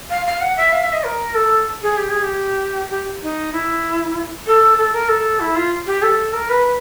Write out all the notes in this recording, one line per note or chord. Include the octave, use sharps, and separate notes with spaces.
F5
F5
F#5
E5
F5
E5
D#5
A#4
A4
G#4
G4
G#4
G4
G4
D#4
E4
A4
A4
A#4
A4
E4
F4
G4
A4
A#4
B4
B4